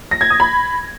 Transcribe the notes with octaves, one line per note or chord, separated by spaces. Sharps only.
A#6
G#6
D#6
B5